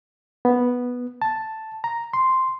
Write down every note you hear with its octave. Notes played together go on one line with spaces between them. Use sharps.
B3
A5
A#5
C6